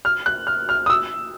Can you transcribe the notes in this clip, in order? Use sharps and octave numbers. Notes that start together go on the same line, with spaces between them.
F6
F#6
F6
F6
D#6
E6